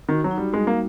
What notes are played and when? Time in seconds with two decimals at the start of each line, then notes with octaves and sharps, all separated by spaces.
0.09 D#3 F#4
0.24 F#3
0.31 D#4
0.38 G3
0.53 G3 G#3
0.67 A#3